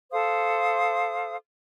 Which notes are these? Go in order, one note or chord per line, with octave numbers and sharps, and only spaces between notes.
A4 C5 F5 D#6